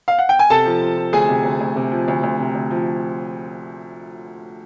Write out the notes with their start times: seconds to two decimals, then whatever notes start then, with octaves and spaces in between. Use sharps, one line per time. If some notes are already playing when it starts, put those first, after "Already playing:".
0.08 F5
0.19 F#5
0.29 G5
0.39 G#5
0.50 C3 A4 A5
0.66 F3
0.82 F3
0.97 F3
1.13 D2 G#4 G#5
1.29 C3
1.44 D2
1.60 D2
1.76 C3
1.92 F3
2.08 D2
2.23 D2
2.39 C3
2.55 D2
2.71 F3